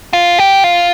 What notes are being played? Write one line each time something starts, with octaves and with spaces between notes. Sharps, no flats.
F4
G4
F4